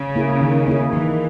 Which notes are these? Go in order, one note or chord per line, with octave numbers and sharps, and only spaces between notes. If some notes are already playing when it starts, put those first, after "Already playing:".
Already playing: C#3
A#3 E4 G#4
D#3
A#3 E4 G#4
D#3 E3